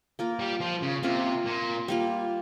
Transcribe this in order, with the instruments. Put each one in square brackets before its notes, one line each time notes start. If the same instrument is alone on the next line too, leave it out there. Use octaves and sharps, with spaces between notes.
[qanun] A#3 F4 A#4
[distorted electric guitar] G3
F3
C#3
[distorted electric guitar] C3 [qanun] A#3 F4 A#4
[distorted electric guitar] A#2
[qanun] G3 A#3 F4